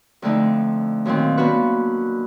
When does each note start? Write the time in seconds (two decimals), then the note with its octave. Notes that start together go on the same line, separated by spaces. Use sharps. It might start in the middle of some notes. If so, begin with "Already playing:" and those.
0.22 F2 D3 A3 D#4
1.05 F#2 A#2 D#3 C4
1.37 A#3 B3 D4 F#4 B4